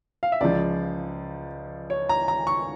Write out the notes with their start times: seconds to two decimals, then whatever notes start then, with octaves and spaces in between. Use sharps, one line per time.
0.23 F5
0.32 E5
0.41 C#2 C#3 F3 D5
1.90 C#5
2.09 A#5
2.28 A#5
2.47 C#6